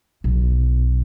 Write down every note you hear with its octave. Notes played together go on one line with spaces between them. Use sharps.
B1